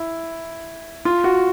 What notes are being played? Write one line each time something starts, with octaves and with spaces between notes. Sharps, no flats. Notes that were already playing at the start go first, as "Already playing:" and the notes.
Already playing: E4
F4
F#4